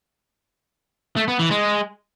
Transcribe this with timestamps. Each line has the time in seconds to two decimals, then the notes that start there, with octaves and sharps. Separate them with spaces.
1.17 A3
1.28 B3
1.39 E3
1.51 G#3